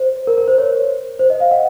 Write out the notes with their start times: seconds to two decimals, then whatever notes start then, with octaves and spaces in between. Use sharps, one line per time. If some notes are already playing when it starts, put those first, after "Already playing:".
Already playing: C5
0.27 A#4
0.38 A#4
0.48 C5
0.58 C#5
1.19 C5
1.30 D#5
1.40 F5
1.51 F#5